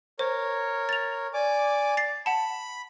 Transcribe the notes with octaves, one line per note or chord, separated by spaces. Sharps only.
A#4 C5 C#5
A6 F7
D5 G#5 D6
A6 C7
F#5 A5 B5